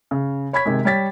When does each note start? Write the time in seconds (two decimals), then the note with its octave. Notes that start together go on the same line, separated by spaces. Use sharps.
0.11 C#3
0.53 C#5 B5 C#6 G#6 B6
0.65 C3 D#3 G#3
0.85 G3 C#5 A6 B6